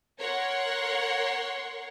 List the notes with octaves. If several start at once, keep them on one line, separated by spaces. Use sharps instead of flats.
A#4 C#5 F#5 C6 C#6